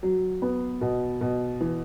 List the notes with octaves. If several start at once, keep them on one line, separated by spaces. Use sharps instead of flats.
F#3
B3
B2
B2
E3